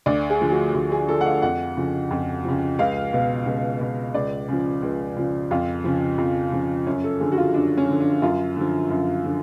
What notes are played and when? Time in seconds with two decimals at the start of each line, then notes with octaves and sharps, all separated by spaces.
0.06 D2 D5
0.30 G#4
0.41 D3 F3
0.52 F#4
0.74 D2 F#4
0.92 G#4
1.08 D3 F3 A4
1.21 F#5
1.26 F5
1.42 F2 F#5
1.77 C#3 F3
2.11 F2
2.44 C#3 F3
2.79 C#2 F5
3.13 B2
3.46 C#2
3.81 B2
4.14 C#2 D5
4.48 C#3 F3
4.82 C#2
5.17 C#3 F3
5.51 F2 F4
5.84 C#3 F3
6.18 F2
6.52 C#3 F3
6.87 F#2 C#4
7.04 A4
7.20 D3 F3 G#4
7.32 F#4
7.38 F4
7.54 F#2 D4
7.77 C#4
7.88 D3 F3
8.00 D4
8.22 F#2 F4
8.56 D3 F3
8.90 F#2
9.24 D3 F3